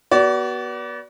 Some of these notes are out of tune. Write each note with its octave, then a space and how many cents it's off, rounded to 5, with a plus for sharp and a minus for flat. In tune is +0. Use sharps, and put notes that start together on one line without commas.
B3 -25 F#4 +30 D5 -25